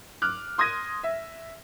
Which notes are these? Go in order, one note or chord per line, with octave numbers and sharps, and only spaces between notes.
D6 F6 F#6
C6 D#6 G#6 A#6 D#7
E5